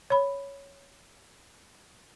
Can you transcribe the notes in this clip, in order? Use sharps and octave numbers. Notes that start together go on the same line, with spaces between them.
C#5 B5